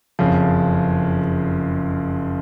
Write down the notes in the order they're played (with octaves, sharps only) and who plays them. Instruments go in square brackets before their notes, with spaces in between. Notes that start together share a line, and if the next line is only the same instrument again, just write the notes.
[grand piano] F#1 F2 C#3 F3